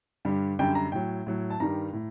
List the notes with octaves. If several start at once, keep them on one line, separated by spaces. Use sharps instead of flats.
G2 D3 G3
F#2 D3 G3 G5
A#5
A2 F#3 G5
A2 F#3
A5
G2 D#3 G3 A#5
A2